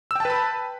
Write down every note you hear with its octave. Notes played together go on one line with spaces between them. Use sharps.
B4 G5 A5 B5 E6